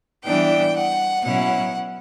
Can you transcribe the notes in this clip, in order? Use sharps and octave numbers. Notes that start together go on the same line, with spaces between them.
E3 G3 B3 D4 G5
F#5
B2 F#3 C#4 E4 F#5